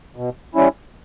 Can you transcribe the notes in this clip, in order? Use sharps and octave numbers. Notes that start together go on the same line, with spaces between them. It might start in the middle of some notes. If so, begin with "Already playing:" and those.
B2
G3 C#4 E4